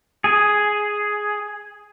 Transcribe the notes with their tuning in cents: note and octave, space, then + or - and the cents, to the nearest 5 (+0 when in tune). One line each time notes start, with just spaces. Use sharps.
G#4 +5